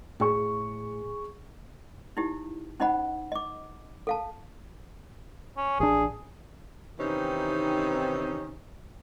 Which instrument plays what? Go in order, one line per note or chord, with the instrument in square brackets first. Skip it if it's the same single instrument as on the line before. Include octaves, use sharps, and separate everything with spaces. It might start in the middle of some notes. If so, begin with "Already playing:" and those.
[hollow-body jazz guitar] A2 [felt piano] G#4 C#6
[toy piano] D#4 E4 G4
C#4 D#4 C5 D#5 F#5 B5
D#5 D6
A4 F5 A5
[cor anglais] C#4
[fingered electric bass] A1 D4 [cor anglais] G#4
[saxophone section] C3 D#3 E3 C4 C#4 D#4